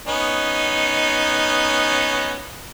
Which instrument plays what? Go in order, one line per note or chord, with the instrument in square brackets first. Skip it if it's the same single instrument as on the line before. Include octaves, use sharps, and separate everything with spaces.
[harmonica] B3 C#4 D#4